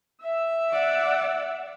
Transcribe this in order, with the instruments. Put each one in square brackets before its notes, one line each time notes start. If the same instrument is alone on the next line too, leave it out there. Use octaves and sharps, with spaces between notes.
[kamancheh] E5 E6
[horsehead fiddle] D5 F#5